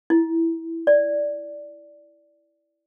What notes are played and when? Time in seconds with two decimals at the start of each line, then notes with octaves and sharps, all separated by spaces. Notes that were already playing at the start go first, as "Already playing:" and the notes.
0.10 E4
0.87 D5